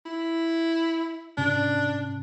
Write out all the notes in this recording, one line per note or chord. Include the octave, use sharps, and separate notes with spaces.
E4
G#2 C3 C#4 D4